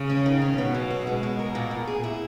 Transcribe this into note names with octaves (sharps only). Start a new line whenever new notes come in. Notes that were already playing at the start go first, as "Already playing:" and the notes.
Already playing: C#3
C#4
D#3
C#4
B2 B3
F#3
F#4
B2 G#3
G#3
A#4
A#2
A#2
G#4
E4